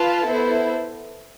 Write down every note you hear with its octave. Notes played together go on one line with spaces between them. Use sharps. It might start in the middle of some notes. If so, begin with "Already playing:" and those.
Already playing: F4 B4 F5 A5
B3 E4 A4 C5